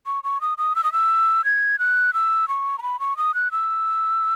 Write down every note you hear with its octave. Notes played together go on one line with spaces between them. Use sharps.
C#6
C#6
D#6
D#6
E6
D#6
E6
G#6
F#6
E6
C#6
A#5
B5
C#6
D#6
F#6
E6